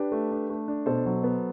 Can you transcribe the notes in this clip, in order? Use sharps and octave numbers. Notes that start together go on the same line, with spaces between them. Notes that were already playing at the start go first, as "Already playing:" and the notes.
Already playing: D4 G4 B4
A3
D4
A3
D4
B2 A4 C5
F#3
B3